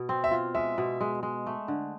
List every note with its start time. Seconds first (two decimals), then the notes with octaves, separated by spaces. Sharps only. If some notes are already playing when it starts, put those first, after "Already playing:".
Already playing: B2
0.09 C4
0.24 E5
0.31 F4
0.55 G#3 E5
0.78 B2
1.01 G#3
1.23 G#3
1.46 A3
1.68 D3